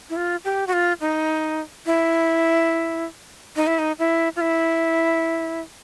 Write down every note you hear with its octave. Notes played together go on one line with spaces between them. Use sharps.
E4
F4
G4
F#4
F4
D#4
E4
D#4
E4
D#4
E4
F4
E4